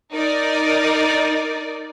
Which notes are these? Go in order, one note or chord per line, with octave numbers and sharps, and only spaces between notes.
D#4 A#4 D5